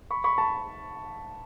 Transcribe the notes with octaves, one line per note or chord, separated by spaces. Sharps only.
B5 C#6
B5 C#6
A5 B5